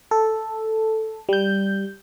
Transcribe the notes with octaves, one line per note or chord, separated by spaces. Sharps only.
A4
G3 G6